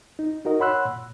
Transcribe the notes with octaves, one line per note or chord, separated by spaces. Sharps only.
D#4
D#4 F#4 A#4 D#5
C#5 F#5 B5 C6 E6 F#6
A#2